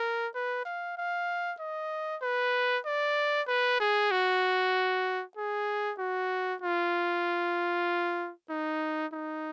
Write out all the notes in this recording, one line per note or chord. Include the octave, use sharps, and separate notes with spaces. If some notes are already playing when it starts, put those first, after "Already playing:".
Already playing: A#4
B4
F5
F5
D#5
B4
D5
B4
G#4
F#4
G#4
F#4
F4
D#4
D#4